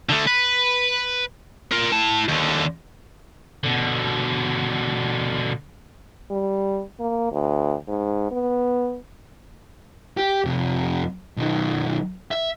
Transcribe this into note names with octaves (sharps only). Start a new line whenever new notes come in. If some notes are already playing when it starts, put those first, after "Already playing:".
D3 A3
B4
F4 A#4
E4 A5
D#2 D3
B2 D3
G3
A#3
D2
G#2
B3
G4
F2 C3
B1 D#3
E5